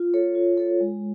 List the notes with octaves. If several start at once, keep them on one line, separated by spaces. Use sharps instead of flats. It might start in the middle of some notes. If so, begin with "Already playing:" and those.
Already playing: F4
A4 C#5
F4
A4 C#5
G#3